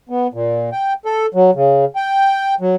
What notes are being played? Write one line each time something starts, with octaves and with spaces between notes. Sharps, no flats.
B3
A#2
G5
A4
F#3
C#3
G5
F#3